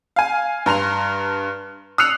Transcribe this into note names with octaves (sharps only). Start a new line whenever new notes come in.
F5 G#5
G2 A#5 C6 F7
D#6 E6 F#6 C7 C#7 F7